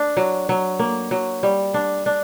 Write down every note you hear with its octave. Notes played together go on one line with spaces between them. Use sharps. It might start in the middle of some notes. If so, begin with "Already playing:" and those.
Already playing: D4
F#3
F#3
A#3
F#3
G3
D4
D4